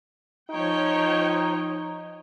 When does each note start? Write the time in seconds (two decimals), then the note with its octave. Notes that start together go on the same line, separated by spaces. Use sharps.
0.51 F3 D#4 C#5 G5